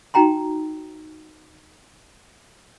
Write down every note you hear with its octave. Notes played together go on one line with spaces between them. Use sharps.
D#4 F#4 G5 A#5 C6